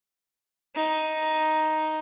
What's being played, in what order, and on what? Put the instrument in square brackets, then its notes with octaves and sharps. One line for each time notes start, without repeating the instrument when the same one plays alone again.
[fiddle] D#4